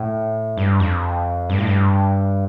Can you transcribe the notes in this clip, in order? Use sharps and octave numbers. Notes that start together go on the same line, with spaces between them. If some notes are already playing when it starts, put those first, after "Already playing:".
Already playing: A2
G2
F2
G2
A2
G2